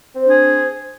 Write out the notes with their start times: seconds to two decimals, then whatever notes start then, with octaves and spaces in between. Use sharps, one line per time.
0.15 C4
0.20 C5
0.25 D4
0.29 G#4